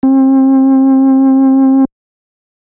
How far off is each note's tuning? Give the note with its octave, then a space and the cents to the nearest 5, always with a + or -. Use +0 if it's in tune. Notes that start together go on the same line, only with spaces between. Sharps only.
C4 +35